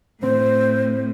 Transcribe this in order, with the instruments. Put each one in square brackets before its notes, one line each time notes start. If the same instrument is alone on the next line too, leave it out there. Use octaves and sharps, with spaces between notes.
[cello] A2 [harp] C4 [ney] C5